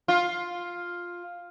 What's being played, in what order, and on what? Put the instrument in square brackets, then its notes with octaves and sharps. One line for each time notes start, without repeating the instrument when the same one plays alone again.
[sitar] F4